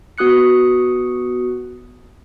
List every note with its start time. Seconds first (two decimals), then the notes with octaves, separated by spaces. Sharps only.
0.18 B3 F#4 D#6 F#6 C#7